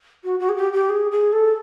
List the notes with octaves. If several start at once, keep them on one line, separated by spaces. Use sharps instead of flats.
F#4
F#4
G#4
G4
G4
G#4
G#4
A4